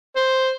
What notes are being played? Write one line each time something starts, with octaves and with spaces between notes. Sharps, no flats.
C5